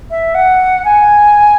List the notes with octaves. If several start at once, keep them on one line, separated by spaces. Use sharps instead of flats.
E5
F#5
G#5